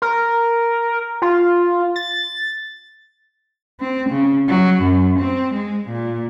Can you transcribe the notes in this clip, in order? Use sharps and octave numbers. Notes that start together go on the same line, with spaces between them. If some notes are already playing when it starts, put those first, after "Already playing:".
A#4
F4
A6
C4
C#3
F#3
F#2
C4
G#3
A#2